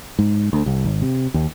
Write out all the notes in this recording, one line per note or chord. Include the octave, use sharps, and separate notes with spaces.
G#2
D2
C2
G#1
C3
D#2